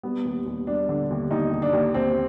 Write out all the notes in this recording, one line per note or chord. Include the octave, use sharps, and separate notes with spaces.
G3 B3
D#2
D#2
G3 D4
D3
D#2
D#2 D#4
D#2
D4
D#2
D#2 C4